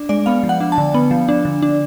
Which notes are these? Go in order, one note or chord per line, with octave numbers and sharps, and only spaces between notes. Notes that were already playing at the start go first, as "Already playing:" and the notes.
Already playing: D4
G#3 D5
B3 F5
F3
F#5
D4
A5
D3
B3
F3
D4
D3
D4